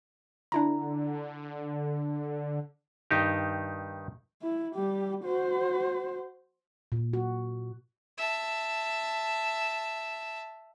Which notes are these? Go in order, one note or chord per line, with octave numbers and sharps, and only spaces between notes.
D3 D4 E4 A#5
G2 D#3 D#4 G4
E4
G3 G4
F#4 C5
A#2
F#4
E5 A5